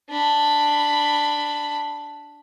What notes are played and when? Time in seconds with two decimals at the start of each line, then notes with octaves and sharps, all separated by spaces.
0.10 D4 B5